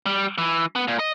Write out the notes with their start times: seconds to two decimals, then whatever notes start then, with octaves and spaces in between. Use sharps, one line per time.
0.06 G3
0.38 E3
0.75 B3
0.88 A#2
0.99 D#5